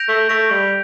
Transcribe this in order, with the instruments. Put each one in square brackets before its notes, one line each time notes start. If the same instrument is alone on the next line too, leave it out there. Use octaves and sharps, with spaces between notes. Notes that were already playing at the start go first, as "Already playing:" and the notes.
Already playing: [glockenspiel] G6 A#6 D7 F7
[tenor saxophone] A3
[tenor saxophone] A3 [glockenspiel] G6 A#6 D7 F7
[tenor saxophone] G3